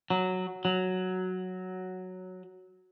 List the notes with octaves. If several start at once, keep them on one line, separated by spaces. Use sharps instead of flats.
F#3
F#3